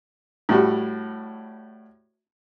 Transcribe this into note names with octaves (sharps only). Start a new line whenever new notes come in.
A2 G3 F#4